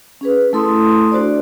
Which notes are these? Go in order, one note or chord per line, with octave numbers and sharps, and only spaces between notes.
C#4 G#4 B4
A3 E4 A4 C6 D#6
D4 F#4 C5 D5